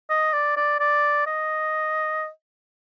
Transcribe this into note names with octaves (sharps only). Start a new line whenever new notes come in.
D#5
D5
D5
D5
D#5